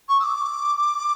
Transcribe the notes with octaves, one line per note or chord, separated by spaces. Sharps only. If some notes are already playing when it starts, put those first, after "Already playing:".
C#6
E6
D6